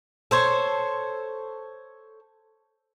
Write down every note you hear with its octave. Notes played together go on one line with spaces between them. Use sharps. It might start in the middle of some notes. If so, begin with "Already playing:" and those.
A4 C5 C#5